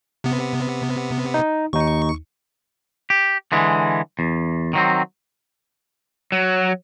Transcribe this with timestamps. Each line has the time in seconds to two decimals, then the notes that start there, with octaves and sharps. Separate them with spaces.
0.24 C3 B3
1.34 D#4
1.73 D#2 D#4 C#6
3.10 G4
3.52 D3 E3 G#3
4.19 E2
4.73 D#3 F#3 C4
6.32 F#3